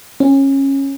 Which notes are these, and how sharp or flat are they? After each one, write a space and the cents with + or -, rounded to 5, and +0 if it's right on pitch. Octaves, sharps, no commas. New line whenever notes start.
C#4 -20